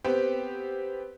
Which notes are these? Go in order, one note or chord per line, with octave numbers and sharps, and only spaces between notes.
B3 C4 G4